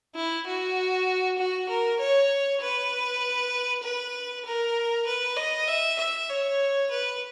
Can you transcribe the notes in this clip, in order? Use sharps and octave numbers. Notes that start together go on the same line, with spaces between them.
E4
F#4
F#4
A#4
C#5
B4
B4
A#4
B4
D#5
E5
E5
C#5
B4